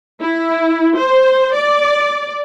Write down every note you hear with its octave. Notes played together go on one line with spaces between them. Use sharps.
E4
C5
D5